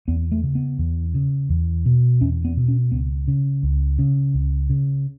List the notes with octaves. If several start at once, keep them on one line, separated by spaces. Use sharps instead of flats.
E2 B3
A3
C#3
B3
E2
C#3
E2
B2
E2 C#4
B3
B2
C#4
C#2 B3
C#3
C#2
C#3
C#2
C#3